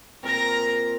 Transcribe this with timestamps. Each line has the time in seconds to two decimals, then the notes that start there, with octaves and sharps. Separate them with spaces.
0.23 A#2 C4 A#4 A#5